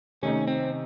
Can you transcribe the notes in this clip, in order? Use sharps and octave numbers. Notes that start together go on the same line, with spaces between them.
C3 D#3 A3 C#4 D#4
C4